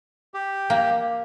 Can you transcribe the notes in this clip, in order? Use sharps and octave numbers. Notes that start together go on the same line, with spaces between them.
G4
A#3